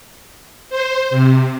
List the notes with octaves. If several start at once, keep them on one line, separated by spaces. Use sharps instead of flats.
C5
C3